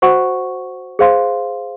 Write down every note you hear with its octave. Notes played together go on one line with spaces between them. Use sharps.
F#4 C5 F#5 C#6
G#4 C5 F5 C6